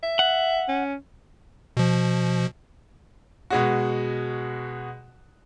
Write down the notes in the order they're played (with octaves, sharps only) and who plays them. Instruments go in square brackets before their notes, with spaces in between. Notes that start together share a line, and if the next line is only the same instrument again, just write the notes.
[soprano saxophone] E5
[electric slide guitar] F#5
[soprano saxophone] C#4
[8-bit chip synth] B2 F3
[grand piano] B2 G#3 F#4